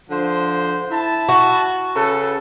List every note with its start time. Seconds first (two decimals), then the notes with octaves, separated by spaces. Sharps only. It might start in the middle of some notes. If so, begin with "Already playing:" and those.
0.10 D3 F3 C5
0.90 E4 A5
1.29 F#4
1.96 C#3 A4 B4